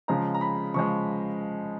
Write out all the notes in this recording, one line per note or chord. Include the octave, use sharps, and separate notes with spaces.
C#3 F3 G#3 A#5
A#5
B5
C#3 F3 G#3 C#6